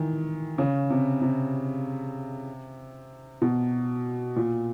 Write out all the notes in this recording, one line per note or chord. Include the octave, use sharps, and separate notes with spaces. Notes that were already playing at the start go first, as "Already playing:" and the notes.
Already playing: D#3 E3
C#3
C3
C3
B2
A#2